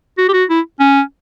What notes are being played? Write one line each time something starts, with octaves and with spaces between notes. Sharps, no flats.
F#4
G4
F#4
E4
C#4